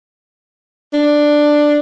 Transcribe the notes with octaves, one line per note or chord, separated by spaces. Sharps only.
D4